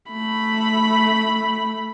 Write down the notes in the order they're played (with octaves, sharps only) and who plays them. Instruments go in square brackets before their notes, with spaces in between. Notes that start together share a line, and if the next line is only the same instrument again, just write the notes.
[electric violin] A3 B5